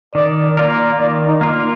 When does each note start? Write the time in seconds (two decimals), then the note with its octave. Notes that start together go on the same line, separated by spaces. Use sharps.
0.15 D#3 D5
0.57 A#3 F4 A#4 D5
0.99 D#3 D5
1.28 D#4
1.41 A#3 F4 A#4